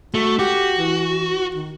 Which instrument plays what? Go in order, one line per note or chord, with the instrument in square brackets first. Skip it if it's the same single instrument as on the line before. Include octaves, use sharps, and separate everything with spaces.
[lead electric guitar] A3 [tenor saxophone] F#4
[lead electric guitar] F#4 [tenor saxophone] G4
[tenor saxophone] E3
D#3